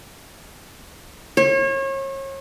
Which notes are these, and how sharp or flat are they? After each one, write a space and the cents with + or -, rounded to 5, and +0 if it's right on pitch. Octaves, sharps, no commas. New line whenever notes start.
C#5 -35